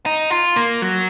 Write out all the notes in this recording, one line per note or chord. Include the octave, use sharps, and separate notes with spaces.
D#4
F4
A#3
F#3